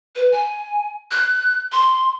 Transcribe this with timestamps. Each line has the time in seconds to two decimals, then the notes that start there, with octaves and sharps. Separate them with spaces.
0.16 B4
0.32 G#5
1.11 F#6
1.72 C6